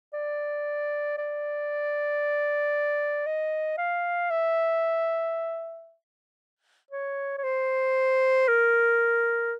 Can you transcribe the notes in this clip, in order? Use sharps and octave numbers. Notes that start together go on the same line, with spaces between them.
D5
D5
D#5
F5
E5
C#5
C#5
C5
A#4